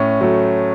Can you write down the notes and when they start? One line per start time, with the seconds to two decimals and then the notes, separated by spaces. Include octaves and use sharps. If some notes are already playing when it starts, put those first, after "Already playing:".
Already playing: A2 C#4
0.21 F#3 A3